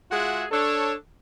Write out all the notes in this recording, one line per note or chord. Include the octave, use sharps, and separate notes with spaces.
G#3 F4 F#4 G#4 E5 F#5
D4 A4 C#5